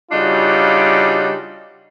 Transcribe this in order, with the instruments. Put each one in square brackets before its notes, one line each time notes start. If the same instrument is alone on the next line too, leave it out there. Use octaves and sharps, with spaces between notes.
[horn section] C#3 G3 D4 D#4 F4 F#4